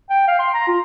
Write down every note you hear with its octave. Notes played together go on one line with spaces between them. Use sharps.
G5
F5
C6
A#5
F4